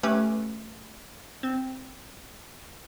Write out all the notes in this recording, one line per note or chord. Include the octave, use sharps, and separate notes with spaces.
A3 C#4 G4 B4
C4